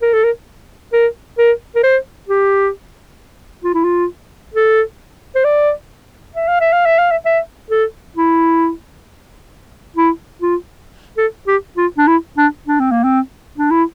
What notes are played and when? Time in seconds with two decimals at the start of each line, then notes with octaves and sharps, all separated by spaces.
0.02 A#4
0.13 A4
0.24 A#4
0.93 A#4
1.38 A#4
1.76 A#4
1.83 C5
2.28 G4
3.64 F4
3.74 E4
3.84 F4
4.54 A4
5.35 C5
5.45 D5
6.35 E5
6.48 F5
6.60 E5
6.73 F5
6.86 E5
6.99 F5
7.12 E5
7.26 E5
7.71 A4
8.16 E4
9.97 E4
10.42 F4
11.17 A4
11.47 G4
11.77 F4
11.98 D4
12.07 E4
12.38 D4
12.67 D4
12.80 C4
12.91 A#3
13.04 C4
13.58 D4
13.71 E4